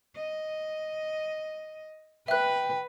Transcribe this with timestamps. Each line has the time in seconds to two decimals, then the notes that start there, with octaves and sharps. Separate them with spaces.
0.16 D#5
2.28 B4 E5 G5 F#6